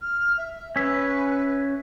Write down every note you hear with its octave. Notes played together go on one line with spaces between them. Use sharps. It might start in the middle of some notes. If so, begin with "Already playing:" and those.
F6
E5
C#4 B4 E5